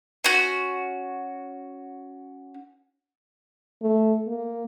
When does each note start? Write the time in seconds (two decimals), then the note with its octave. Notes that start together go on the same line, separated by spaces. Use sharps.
0.24 C#4 F#4
3.82 A3
4.27 A#3